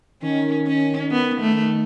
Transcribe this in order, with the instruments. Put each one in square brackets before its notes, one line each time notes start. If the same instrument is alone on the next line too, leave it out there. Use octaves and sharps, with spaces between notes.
[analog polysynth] D#3 [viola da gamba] C#4
[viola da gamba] C#4
B3
A3